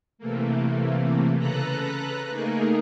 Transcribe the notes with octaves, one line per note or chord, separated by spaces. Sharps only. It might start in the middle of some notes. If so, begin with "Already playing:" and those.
C3 E3 A3 A#3
C#3 A4 B4 A#5 F#6
A3 A#3 D#4 G#4 A#4